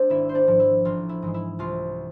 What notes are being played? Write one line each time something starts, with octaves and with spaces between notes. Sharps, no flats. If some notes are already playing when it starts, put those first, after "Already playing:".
Already playing: G#3 C4 D4 C5 D5
G#1 E4 E5
C5
D4 D5
G#2 F3
E4
A1 F4
E4
G#2 E3 G#3
E4
C2 F4